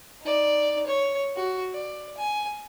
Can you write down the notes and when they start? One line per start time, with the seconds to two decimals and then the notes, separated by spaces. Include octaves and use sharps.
0.22 D#4 D5
0.86 C#5
1.36 F#4
1.73 D5
2.18 G#5